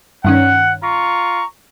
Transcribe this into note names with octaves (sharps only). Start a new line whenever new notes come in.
G2 D#3 C#4 F#5
F4 A#5 C#6